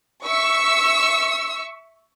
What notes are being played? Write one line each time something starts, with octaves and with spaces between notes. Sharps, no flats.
E5 C#6 E6